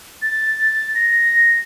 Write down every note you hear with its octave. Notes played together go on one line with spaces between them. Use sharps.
A6
A#6